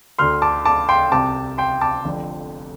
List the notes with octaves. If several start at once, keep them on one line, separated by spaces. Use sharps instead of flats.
D2 D3 C6 F6
A5 D6
A5 D6
G5 C6
C2 C3 A5 D6
G5 C6
A5 D6
F1 F2 D3